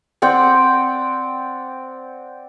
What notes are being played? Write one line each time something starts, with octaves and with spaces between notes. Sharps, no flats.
C4 D5 F#5 G5